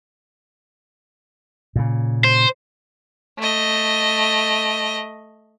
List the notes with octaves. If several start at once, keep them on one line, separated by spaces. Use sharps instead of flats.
A#2 C#3
C5
A3 D#5